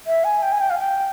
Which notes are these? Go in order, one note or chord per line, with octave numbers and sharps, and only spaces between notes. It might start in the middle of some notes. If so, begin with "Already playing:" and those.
E5
G#5
G5
G#5
G5
F5
G5